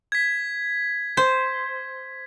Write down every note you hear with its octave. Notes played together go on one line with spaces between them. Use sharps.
G#6 B6
C5